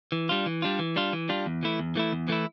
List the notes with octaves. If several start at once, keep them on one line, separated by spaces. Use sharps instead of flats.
E3
G3 D4 F4
E3
G3 D4 F4
E3
G3 D4 F4
E3
G3 D4 F4
E2
E3 A3 E4
E2
E3 A3 E4
E2
E3 A3 E4